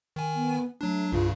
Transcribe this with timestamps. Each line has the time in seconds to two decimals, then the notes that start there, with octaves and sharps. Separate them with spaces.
0.16 D#3 G#5
0.35 B3
0.81 F#3 A3 D4
1.12 C2 G2 C#3 F4